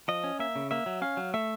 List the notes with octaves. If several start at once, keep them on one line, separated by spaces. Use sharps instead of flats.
F3 D#5
C#4
A#3 E5
C#3
A#3 E5
F#3
C#4 F5
F#3
A3 E5